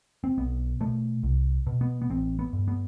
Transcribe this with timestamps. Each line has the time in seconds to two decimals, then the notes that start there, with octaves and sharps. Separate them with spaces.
0.24 C4
0.38 B1 B3
0.80 B2 A3
1.23 C2
1.67 B2
1.81 B3
2.02 B3
2.10 A1 C4
2.39 B3
2.53 G2
2.68 B3